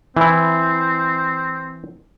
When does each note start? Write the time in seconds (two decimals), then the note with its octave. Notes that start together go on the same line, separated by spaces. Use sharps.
0.17 E3 C4 E4